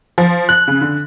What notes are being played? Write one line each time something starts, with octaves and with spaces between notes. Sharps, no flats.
F3
F#6
C#3
D3